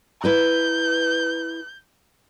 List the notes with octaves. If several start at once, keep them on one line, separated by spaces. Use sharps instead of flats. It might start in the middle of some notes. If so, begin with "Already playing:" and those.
E4 B4 A#5 G6